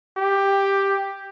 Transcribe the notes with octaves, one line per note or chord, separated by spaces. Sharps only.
G4